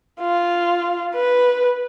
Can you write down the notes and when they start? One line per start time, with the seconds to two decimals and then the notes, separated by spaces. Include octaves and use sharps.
0.21 F4
1.15 B4